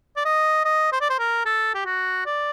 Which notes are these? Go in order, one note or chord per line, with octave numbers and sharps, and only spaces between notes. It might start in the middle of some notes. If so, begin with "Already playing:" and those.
D5
D#5
D#5
C5
D5
C5
A#4
A4
G4
F#4
D5